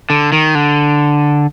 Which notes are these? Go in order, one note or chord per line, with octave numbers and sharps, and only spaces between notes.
D3
D#3
D3